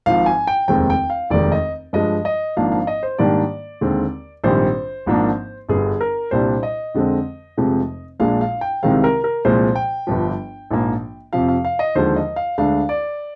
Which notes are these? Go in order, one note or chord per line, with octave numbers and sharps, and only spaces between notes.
G#1 G#2 F3 F5
G#5
G5
F1 D#2 D#3 G#3 C4 G5
G5
F5
F1 D#2 D#3 G#3 D5
D#5
G2 F3 G#3 D#5
D#5
G#1 G#2 F3 A#3 D4 F5
F5
D#5
C5
G#2 D#3 G3 A#3 D4 D5
D#2 D3 G#3 C4
A#1 G#2 D#3 G3 C4 C5
G#1 G#2 F3 A#3 D4
G1 G2 D3 G#4
A#4
C2 A#2 G3 D4 C5
D#5
F2 D3 G#3 C4
F1 F2 C3 F3 G#3
A#1 A#2 G#3 D4 F5
F5
G5
C2 C3 D#3 G#3 C4 F5
A#4
A#4
C2 A#2 F3 G#3 C5
G5
G1 G2 F3
A#1 G#2 F3 A#3
F2 C3 F3 F5
F5
F5
D#5
D#2 D3 F3 G#3 C5
D#5
F5
D2 D3 G#3 D4 F5
D5